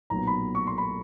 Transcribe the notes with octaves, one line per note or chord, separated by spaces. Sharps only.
B1 A#2 F#3 B3 A#5
B5
C#6
C6
B5